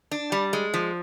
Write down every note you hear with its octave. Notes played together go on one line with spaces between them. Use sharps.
D4
G3
G#3
F3